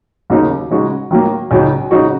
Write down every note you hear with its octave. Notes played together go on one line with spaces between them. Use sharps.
D#2 C#3 F#3 A#3 D#4
C#3 G#3 D#4 F#4
D#3 F#3 A#3
C#2 C#3 F#3 D#4
C#3 F#3 D#4 F#4